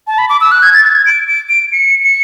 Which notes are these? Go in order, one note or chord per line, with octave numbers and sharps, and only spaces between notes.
A5
B5
D6
E6
F#6
G#6
A6
A6
G#6
D7
D7
D7
C#7
C#7